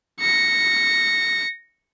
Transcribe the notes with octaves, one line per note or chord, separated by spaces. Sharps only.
A#6 C#7